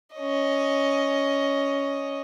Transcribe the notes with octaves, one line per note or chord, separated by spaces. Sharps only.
C#4 D#5